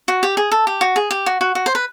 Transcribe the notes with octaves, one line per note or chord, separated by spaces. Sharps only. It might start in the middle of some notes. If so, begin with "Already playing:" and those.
F#4
G4
G#4
A4
G4
F#4
G#4
G4
F#4
F#4
F#4
C5
B4